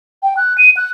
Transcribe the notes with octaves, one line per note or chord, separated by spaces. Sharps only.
G5
F#6
D#7
F#6